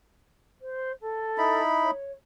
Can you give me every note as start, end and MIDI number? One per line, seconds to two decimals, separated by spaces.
0.61 0.92 72
1.01 1.61 69
1.38 1.91 63
1.38 1.91 64
1.38 1.91 83
1.82 2.12 73